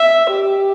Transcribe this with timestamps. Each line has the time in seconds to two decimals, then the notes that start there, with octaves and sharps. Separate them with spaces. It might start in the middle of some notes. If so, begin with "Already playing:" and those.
Already playing: E5
0.30 G4